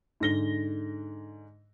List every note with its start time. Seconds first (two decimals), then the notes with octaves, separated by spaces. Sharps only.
0.20 G#2 D3 A#6 G7